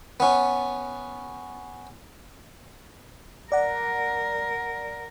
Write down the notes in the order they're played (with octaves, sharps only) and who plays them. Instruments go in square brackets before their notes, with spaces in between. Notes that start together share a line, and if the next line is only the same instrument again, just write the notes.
[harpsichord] B3 C#4
[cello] A#4 [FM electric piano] D5 F#5